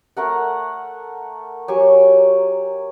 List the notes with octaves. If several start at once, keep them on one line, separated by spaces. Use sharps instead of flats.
A3 A#4 F#5
F#3 G4 G#5 C#6